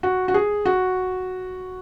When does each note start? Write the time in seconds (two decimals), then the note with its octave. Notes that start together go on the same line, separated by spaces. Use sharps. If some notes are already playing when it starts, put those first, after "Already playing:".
0.03 F#4
0.28 F#4
0.34 G#4
0.65 F#4